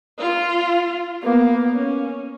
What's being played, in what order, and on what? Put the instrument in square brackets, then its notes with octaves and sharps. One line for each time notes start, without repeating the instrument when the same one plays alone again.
[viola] F4
[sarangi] A#3 [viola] B3
[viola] C#4